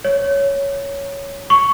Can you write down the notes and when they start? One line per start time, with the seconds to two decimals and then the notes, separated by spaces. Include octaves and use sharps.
0.05 C#5
1.50 C#6